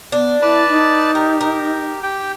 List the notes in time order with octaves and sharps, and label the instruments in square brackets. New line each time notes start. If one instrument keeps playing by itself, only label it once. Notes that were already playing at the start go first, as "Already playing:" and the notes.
[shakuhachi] B3 [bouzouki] D4
[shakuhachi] E4 [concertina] B4 D5 A5
[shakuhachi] D#4
[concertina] G4 [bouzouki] A#4
[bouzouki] A#4
[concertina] G4 G5